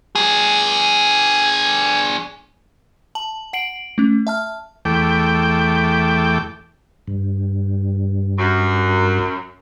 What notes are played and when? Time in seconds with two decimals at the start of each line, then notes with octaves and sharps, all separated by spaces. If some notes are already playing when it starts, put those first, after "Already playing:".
0.15 D4 G#4
3.15 A5 F#7
3.53 F#5 C7 D7 F#7
3.98 A3 C#4
4.27 E5 A5 F6
4.85 E2 A3 G5 D6
7.08 G2
8.39 F#2